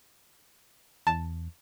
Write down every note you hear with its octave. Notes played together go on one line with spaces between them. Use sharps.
E2 A5